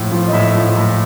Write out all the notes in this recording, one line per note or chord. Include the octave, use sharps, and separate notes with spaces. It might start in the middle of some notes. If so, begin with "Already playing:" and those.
Already playing: A2 F3
F3
D#5
A2 E5
F3
A2